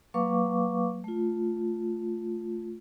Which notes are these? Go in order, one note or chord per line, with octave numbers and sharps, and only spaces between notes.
F#3 A#3 B4 F5 C#6 D6
A3 F4